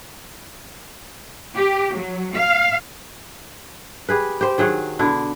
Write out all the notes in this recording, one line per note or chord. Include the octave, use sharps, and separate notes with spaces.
G4
F#3
F5
G4 G#4 B4
G4 C5
D#3 F#3 G#4 F#5
B2 D3 D4 E4